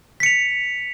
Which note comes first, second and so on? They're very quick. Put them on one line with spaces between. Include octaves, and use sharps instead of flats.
B6 C#7 F7